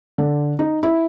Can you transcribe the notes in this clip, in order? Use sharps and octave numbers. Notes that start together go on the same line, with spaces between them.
D3
D#4
E4